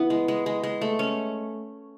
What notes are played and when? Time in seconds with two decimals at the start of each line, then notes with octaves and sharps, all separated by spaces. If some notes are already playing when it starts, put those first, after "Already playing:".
Already playing: E3 B3 E4
0.10 G#3
0.28 G#3
0.46 G#3
0.63 G#3
0.81 A3
0.99 C#4